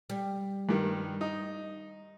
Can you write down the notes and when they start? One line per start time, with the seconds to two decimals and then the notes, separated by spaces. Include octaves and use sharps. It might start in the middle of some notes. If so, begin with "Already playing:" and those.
0.10 G3
0.69 G2 D#3
1.21 D#4